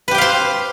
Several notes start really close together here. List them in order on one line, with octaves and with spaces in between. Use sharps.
B4 G4 G5 F5 C5